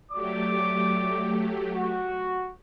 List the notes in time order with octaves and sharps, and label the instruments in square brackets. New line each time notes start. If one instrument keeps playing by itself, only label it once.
[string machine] F#3 A3 G4 [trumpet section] D5 D6
[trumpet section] F#4